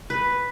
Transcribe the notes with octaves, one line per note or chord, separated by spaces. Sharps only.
B4